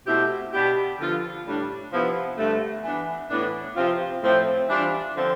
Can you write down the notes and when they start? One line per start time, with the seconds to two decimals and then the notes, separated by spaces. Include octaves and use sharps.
0.07 B2 A3 C4 E4 G4
0.53 B2 B3 D4 G4
0.99 D3 F3 B3 F4
1.45 A2 G3 D4
1.91 C3 F3 B3 E4
2.37 G2 D3 A3
2.84 E3 B3 D4
3.30 A2 E3 B3 D4
3.76 C3 F3 C4 F4
4.22 A2 F3 A3 C4
4.68 E3 G3 D4 F4
5.15 D3 F3 C4